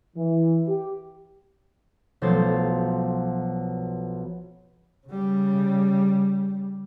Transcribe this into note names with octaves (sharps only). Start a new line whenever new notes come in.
E3
G4
B1 F3 A3 C5 A6
C#3 G3